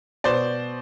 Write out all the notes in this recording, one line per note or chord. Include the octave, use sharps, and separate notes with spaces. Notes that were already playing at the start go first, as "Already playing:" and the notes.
B2 C5 D5